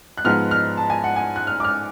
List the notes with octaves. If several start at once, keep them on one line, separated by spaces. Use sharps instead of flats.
F#6
G#2 F3 G#3 B3 F6
F6
A5
G#5
F#5
G#5
F#6
F6
D6
F6